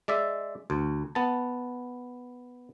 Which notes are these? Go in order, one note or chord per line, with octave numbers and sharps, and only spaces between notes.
G#3 D5 E5
D2
B3 A5